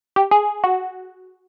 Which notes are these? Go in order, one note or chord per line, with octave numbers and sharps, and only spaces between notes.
G4
G#4
F#4